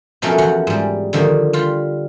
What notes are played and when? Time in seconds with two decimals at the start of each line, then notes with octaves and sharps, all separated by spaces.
0.22 B2 F3 F#3 A3 C#4 A#4
0.38 E2 F3 F#5
0.67 G#2 G3
1.13 D3 D#3 F3 A#3
1.53 G3 F4